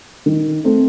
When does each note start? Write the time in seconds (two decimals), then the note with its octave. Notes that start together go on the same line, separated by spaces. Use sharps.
0.26 D#3
0.64 A3 C4